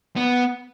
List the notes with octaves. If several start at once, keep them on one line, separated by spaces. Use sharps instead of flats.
B3